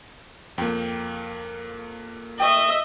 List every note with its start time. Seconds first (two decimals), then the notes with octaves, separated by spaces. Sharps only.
0.58 F2 A#3 G5
2.40 D#5 E5 G5 C#6